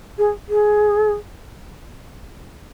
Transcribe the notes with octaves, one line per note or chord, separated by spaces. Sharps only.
G#4
G#4